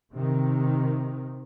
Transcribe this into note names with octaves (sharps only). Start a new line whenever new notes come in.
C3 D#3